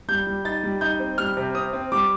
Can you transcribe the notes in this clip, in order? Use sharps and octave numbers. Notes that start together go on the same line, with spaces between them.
G3 G6
G3
D#4 A6
G3
D#4 G6
C4
G3 F6
C3
C4 D#6
C4
G3 D6